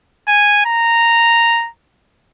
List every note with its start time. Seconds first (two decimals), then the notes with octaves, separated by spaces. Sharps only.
0.28 G#5
0.66 A#5